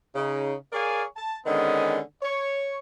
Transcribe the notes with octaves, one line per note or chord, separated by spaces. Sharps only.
C#3 D#4
G#4 A#4 C#5 D5 F5 G#5
A5
D3 D#3 G#3 B3 C#4
C#5